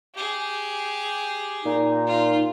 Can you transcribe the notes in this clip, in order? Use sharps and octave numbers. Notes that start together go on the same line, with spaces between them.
G4 G#4
A#2 D#4
F4